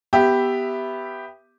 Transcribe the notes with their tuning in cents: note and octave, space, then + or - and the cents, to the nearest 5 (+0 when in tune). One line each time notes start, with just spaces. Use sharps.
B3 +0 G4 +0 E5 +0